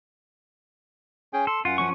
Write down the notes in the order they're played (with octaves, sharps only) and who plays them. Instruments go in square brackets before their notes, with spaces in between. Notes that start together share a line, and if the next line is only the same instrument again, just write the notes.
[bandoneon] C#4 G#4 G5
[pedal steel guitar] A4 [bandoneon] C6
[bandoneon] F#2 F#5 [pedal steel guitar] F4
[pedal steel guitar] F3 C#4 C#6